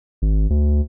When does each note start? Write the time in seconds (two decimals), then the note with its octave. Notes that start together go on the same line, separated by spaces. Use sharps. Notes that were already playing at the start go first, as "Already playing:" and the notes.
0.22 G#1
0.50 D2